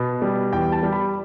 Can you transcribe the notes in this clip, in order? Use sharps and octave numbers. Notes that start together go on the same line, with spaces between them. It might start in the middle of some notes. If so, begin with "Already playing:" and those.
Already playing: B2 B3
G3
E2 G5
A5
G3
B5